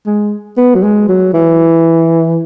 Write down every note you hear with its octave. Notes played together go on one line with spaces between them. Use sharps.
G#3
B3
F#3
G#3
F#3
E3